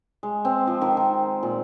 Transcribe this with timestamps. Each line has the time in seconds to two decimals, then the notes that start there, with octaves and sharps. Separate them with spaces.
0.23 G#3
0.45 C4
0.67 F3
0.81 D#3
0.97 D#3
1.43 A#2